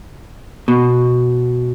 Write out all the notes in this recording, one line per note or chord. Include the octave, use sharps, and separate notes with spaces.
B2